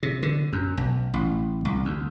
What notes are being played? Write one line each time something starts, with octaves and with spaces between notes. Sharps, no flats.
C3
D3
F#2
B1
A1
C2
D2